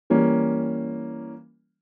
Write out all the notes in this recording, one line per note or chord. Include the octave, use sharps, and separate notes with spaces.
E3 G3 A#3 C#4